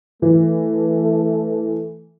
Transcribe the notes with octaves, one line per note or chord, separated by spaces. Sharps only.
E3 A3